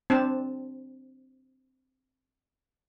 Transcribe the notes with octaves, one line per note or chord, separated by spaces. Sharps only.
C4 D4 A5